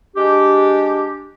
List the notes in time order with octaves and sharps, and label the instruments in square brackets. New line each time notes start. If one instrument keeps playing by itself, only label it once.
[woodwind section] G#3 D4 G4